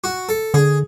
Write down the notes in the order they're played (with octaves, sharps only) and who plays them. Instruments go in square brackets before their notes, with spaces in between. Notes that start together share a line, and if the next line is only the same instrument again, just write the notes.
[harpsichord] F#4
A4
[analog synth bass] D3 [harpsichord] G#4